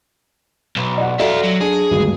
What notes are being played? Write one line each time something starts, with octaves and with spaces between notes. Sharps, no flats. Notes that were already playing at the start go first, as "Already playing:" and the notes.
B1
D5 F#5
F#4 A4 D5 E5 F5
F#3
D4 G#4
G#1 D2 G2